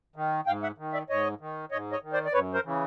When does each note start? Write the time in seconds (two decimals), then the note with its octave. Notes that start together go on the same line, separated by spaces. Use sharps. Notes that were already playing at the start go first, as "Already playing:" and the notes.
0.16 D#3
0.47 G#2 F5 G5
0.63 E5 F#5
0.78 D#3
0.93 D5 E5
1.09 G#2 C#5 D#5
1.40 D#3
1.71 G#2 C#5 D#5
1.92 C#5 D#5
2.03 D#3
2.13 C5 D5
2.26 D5
2.33 F#2 B4 C#5
2.54 A#4 C5
2.65 C#3 E3